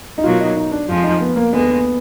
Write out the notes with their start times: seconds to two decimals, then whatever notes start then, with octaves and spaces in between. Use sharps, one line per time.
0.18 D#4
0.24 B2 F#3 A#3 F4
0.40 D#4
0.56 D#4
0.72 D4
0.88 F2 F3 G#3 F4
1.04 D#4
1.21 B3
1.36 A#3
1.53 D#2 D3 G#3 B3